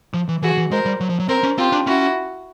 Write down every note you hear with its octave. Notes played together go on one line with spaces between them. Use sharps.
F3
E3
E3 F#4 G#4
E3
G#3 A#4 C5
G3
F#3
F3
F#3
C4 A#4 C5
C#4
C4 F4 G4
D4
C#4 E4 F#4